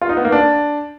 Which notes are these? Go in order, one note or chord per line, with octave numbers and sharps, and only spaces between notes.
F4
D#4
B3
A#3
D4